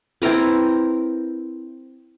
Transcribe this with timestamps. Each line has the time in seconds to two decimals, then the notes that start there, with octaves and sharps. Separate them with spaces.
0.22 C4 E4 A#4 B4